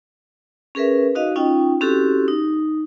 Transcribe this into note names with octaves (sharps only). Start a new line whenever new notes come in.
C#4 G#4 A#4 B4 E5
D#4 F#4 D#5 F5
C#4 D#4 F4 G5
C4 C#4 E4 F#4 G4 A4
D#4